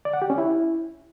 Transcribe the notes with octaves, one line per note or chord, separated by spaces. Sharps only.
D5
F#5
G4
C#4
E4